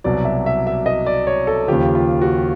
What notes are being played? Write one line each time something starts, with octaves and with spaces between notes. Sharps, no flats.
C2 B2 F#3 D5
E5
E5
E5
D#5
D5
C#5
A4
D#2 C#3 F3 G4
F4
F#4